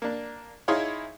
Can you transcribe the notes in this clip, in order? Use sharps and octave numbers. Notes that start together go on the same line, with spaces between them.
A#3 D4
D#4 E4 G#4 C#5 F5 C6